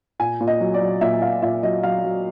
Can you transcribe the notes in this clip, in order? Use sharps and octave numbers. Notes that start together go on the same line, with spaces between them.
A#2 G#5
A#2
D#5
F#3
D5
F#3
A#2 E5
A#2 F5
A#2 E5
F#3 D#5
F#3 F5
F#3